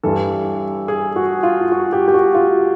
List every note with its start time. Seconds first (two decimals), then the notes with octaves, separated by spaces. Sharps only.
0.03 G2 E3 A4
0.88 G#4
1.16 F#4
1.43 F4
1.72 F#4
1.93 G4
2.08 G4
2.14 F#4
2.34 F4